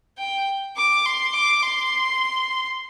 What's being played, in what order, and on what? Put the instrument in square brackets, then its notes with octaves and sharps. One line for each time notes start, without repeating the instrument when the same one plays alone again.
[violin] G5
D6
C6
D6
C6